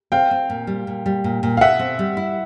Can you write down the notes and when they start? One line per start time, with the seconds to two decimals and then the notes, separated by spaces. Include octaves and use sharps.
0.12 C4 F5 G5
0.31 C4
0.50 A#2
0.67 G3
0.87 A#2
1.06 G3
1.24 A#2
1.43 A#2
1.57 F5
1.61 B2 E5 F#5
1.79 C4
1.99 G3
2.17 E4